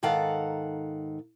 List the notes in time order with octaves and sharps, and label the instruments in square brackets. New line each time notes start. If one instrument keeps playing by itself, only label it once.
[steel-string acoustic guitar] G#2 D#3 A4 F5 F#5 A#5